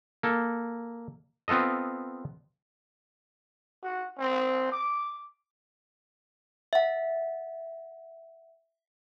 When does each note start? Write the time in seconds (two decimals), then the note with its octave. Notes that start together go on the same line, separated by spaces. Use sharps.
0.23 A#3 A4
1.48 B3 C4 F4 A4 D#5
3.83 F#4
4.19 C4
4.72 D6
6.73 E5 F#5